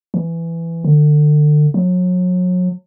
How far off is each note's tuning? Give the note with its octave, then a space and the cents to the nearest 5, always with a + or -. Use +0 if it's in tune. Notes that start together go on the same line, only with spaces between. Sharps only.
E3 +15
D3 +30
F#3 -35